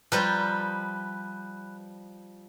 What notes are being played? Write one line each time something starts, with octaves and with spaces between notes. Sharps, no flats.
F3 G3 F4 B4 A#5